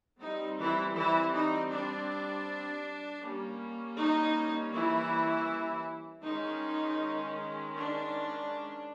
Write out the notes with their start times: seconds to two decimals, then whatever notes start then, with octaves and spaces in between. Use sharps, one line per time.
0.20 G3 C4 D#4
0.58 E3 E4
0.96 E3 E4
1.34 D#4
1.72 D4
3.23 G3 A#3 C#4
3.98 D#4
4.73 E3 E4
6.24 D#3 G#3 C#4 D#4
7.76 D4